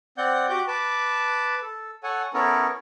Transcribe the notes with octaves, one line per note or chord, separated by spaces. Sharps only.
C4 D5 F#5 G6
F#4 G4 D6 G6
B4 A5 D6
A4
A4 C#5 F#5 G#5
B3 C#4 E4 A4 A#4 C#5